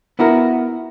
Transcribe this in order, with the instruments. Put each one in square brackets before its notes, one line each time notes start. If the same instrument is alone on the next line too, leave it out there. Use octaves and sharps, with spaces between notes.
[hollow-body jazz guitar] B3 E4 F#4 A#4